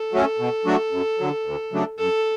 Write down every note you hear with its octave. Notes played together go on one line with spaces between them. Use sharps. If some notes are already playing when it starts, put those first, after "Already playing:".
Already playing: A4
F#3 A3 C#4
B2
F#3 A3 D4 F#4
F#2
D3 F#3
D2
C#3 F#3 A3 D4
F#2 A4